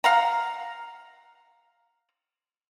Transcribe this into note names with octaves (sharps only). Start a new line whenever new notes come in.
F5 F#5 A#5